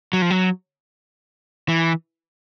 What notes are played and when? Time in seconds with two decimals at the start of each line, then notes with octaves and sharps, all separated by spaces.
0.13 F#3
0.22 F3
0.31 F#3
1.69 E3